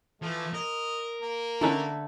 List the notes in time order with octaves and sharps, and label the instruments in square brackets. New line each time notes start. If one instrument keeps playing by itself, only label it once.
[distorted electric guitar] E3 [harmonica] F3 A3
[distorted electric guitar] A#4 [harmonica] D#5
[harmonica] A#3
[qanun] D3 A3 B4 [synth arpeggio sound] C#4 D#4 E4